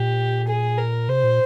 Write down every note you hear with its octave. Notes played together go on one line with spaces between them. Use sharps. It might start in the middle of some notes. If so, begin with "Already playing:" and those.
Already playing: A#2 G4
G#4
A#4
C3 C5
A#2